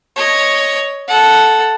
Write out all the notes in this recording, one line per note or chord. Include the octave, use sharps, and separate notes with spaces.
C#5 D#5
A4 F#5